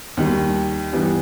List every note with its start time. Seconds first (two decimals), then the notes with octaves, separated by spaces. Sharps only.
0.17 D#2 D#3 G3
0.93 G2 E3 G3 B3 D4